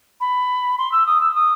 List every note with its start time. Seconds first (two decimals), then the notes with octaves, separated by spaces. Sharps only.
0.21 B5
0.78 C6
0.92 E6
1.06 D#6
1.21 E6
1.35 D#6